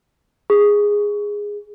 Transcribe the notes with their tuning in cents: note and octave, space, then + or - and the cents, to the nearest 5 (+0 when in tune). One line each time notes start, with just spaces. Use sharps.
G#4 -10